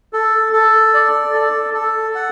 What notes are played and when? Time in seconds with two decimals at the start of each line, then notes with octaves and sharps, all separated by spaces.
0.13 A4
0.53 A4
0.94 D5
1.34 A4
1.74 A4
2.15 F#5